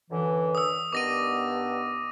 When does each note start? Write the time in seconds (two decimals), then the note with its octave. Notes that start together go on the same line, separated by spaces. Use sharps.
0.10 F#2 D3 E3
0.55 D#6 E6
0.93 G2 D#3 B3 D6 A#6 D#7